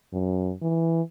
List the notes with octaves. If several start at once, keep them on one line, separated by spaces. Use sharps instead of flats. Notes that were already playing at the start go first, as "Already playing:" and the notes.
F#2
E3